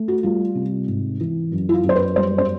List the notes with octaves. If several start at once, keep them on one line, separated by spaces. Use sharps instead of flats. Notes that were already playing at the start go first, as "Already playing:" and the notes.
Already playing: A3
F#4
G3 F4
C3
G#2
E3
F#2
E4
F4
F#2
C5
B4
G3 C5
C5